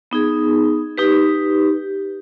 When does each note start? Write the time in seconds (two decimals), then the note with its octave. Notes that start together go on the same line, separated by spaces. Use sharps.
0.11 B3 D#4 G#4
0.98 D#4 G4 B4